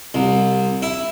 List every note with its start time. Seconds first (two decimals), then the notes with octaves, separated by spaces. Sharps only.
0.14 C2
0.82 E4